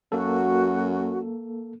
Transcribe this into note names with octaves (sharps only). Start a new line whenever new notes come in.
F#2 A#3 F#4 A4